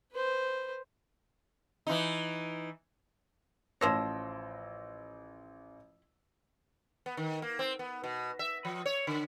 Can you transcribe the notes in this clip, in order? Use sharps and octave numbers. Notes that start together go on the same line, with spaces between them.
B4 C5
E3 D#4
A1 F3 C5 C#5 E6 A#6
B3
D#3
A#3
C4
B3
B2
E5
F3
C#5
D3